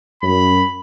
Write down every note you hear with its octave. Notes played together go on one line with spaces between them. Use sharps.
F#2 B5